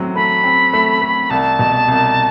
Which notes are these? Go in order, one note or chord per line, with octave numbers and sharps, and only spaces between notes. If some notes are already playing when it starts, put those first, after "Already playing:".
Already playing: A2 F#3 C4
A3 B5
C4
A3
A3
C2 A5
B2
C2